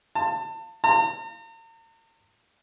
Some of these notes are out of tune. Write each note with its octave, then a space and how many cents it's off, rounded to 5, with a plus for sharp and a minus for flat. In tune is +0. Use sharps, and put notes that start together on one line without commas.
A5 +30
A#5 -45